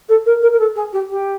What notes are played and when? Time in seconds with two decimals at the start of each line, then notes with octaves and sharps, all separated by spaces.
0.08 A4
0.25 A#4
0.42 A#4
0.52 A#4
0.59 A4
0.75 G#4
0.92 G4
1.09 G4